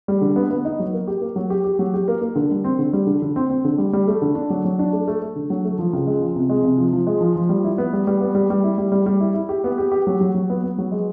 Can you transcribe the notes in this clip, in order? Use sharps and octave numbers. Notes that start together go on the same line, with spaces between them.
G3
D3
B3
B3
D#4
F#3
A#3
G4
A#3
F#3
G4
G4
F#3
G4
A#3
A#3
D3
G3
C4
D3
G3
D3
D3
C4
C4
D3
G3
G3
A3
D3
D4
F#3
F#3
D4
A3
A3
A3
D3
F#3
A3
F3
C#2
G#3
F3
C3
G#3
C3
F3
F3
G#3
F3
F3
G3
E4
B3
G3
G3
B3
G3
G3
E4
G3
G3
G3
E4
E4
G4
B3
G4
G4
F#3
F#3
F#3
B3
B3
F#3
G#3